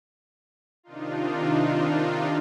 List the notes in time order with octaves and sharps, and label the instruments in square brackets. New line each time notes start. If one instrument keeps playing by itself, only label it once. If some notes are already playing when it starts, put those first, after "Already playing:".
[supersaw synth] C3 D#3 D4 D#4 F4